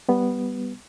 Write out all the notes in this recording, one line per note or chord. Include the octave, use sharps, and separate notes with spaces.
G3 B3